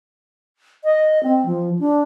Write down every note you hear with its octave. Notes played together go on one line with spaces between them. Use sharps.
D#5
C4
F3
D4